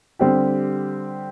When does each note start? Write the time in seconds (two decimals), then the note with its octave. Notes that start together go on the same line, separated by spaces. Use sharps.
0.19 D3 G3 C4 G4